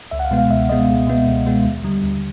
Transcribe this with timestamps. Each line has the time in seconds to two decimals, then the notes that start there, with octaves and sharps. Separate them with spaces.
0.11 C#2 E5
0.19 F#5
0.25 F5
0.31 B2 G#3 B3
0.38 F5
0.49 C#2 E5
0.69 B2 G#3 B3 D#5
0.88 C#2
1.07 B2 G#3 B3
1.26 C#2
1.46 B2 G#3 B3
1.65 D#2
1.84 D3 G3
2.03 D#2